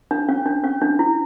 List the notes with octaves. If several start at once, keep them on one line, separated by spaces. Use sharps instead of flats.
D4
C#4
D4
C#4
D4
E4